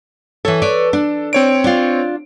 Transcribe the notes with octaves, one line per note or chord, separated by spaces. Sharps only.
E3 A4 C#5
B4 C#5 D5
D4
C4 C#5 D7
D4 F4